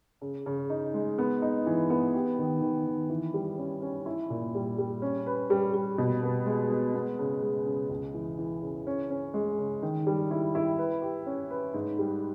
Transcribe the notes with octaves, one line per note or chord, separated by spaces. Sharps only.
C#3
C#3
D#4
G#3
B3
D#4
E3
B3
G4
D#3
D#3
D#3
E3
G3
C#4
C#4
E4
A#2
G3
G3
C#4
B4
G3
G3
B2
B3
G#3
B3
B3
C#3
G#3
C#3
C#2
E3
E3
C#3
C#4
C#4
G#3
C#3
D#3
G3
E4
E4
B4
G4
C#4
B4
G#2
G3